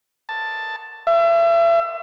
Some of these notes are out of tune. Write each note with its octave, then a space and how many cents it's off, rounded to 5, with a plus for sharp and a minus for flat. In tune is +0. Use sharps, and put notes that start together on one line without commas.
A5 +5
E5 +35